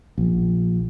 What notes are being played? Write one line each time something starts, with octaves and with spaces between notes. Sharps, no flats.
A#1